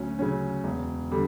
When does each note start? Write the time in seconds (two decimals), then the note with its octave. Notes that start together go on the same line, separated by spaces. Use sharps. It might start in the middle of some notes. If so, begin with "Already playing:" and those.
Already playing: D2 F#3 C#4
0.19 C#3 F#3 C#4
0.64 E1
1.12 D3 G3